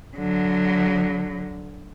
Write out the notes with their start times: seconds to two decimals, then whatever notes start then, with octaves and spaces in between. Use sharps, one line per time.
0.17 D3 F#3